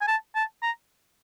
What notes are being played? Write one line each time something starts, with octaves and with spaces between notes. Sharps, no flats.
G#5
A5
A5
A#5